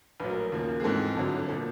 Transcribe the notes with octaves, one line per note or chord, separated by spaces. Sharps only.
A#1 A2 F#3 B4
A#4
D#2 C#3 F3 A#3
G#4
G#2 E3 G#3 C4 A4
G1 F2 D3 F#3
A#2 F3 A4